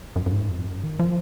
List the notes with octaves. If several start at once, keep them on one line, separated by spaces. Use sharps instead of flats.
F#2
F#2
G#2
F2
F#2
D#3
F3